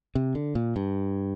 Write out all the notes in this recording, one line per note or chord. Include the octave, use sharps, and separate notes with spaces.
C3
D3
A#2
G2